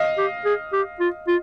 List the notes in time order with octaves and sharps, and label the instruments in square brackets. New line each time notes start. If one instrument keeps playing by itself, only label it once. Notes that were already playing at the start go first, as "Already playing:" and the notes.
Already playing: [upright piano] D#5 F5
[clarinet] G4
G#4
G4
F4
F4